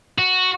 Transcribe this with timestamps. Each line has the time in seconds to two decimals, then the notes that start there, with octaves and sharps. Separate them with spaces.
0.18 F#4